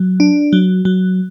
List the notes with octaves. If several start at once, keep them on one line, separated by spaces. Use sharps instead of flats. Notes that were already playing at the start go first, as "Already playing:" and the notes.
Already playing: F#3
D4
F#3
F#3